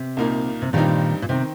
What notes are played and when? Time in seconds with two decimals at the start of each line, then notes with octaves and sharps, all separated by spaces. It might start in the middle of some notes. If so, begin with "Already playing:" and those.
Already playing: C3
0.17 C2 A#2 A#3 D#4
0.62 C3
0.73 G2 A#2 D#3 G3 C4 D#4
1.22 A#2
1.29 C3 D#3 C4